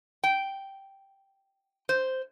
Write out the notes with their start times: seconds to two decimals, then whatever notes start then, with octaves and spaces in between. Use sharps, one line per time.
0.24 G5
1.89 C5